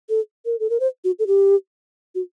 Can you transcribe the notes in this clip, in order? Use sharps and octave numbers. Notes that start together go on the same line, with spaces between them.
A4
A#4
A4
A#4
C5
F#4
A4
G4
F#4